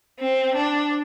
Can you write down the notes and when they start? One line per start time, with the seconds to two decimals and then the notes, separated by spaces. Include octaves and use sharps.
0.19 C4
0.55 D4